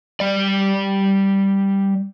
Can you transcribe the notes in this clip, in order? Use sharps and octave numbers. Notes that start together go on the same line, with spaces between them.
G3 D5